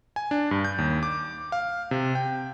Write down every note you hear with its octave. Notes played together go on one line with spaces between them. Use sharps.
G#5
D4
G2
G6
D#2
D6
F5
C3
G5